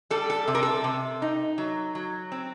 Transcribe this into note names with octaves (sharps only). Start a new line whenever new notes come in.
G3 A4
A4
C3 A4
A#4
A4
C3
D#4
F#3
F#3
C4